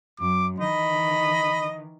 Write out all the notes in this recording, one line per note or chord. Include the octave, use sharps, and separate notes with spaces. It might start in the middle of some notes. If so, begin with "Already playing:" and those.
F#2 D6
D#3 E3 D#5 B5